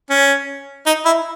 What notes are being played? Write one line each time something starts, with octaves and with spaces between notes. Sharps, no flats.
C#4
D#4
E4